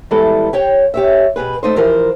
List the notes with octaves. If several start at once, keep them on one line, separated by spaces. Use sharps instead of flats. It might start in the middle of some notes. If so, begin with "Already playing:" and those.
E3 G3 G#3 B3 E4 A4
G4 C#5 G5
G4 C#5 E5
B2 G4 G#4 B4
A3 D#4 C5
E3 F3 G4 A#4 C5